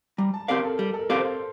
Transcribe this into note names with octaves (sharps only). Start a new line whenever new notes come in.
G3 A#5
A5
C4 G4 A#4 D5 F5
A4
G3
A4
A#4
C4 G4 D5 F5
C5